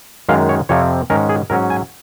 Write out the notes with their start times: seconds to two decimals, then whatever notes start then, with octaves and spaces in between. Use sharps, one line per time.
0.29 F#2 D#3 G#3 F5
0.49 C#5
0.69 F2 C3 F3 C4 C#5
1.10 G#2 D#3 G#3 C#4 A#4
1.29 G#4
1.50 G#2 F#3 C#4 A#4
1.70 G#5